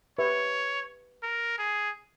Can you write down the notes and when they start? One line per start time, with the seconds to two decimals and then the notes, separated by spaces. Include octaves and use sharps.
0.18 G4 B4 C#5 E5
1.23 A#4
1.58 G#4